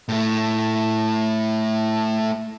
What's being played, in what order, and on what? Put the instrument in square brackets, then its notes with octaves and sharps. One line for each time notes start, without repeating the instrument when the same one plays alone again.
[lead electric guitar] A2 A3